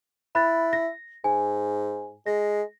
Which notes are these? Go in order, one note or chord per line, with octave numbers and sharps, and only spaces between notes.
E4 B5 F#6 A6
A#6
G#2 G#5
G#3 A#6